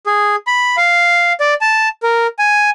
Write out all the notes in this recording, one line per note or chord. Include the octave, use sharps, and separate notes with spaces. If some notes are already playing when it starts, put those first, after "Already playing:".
G#4
B5
F5
D5
A5
A#4
G#5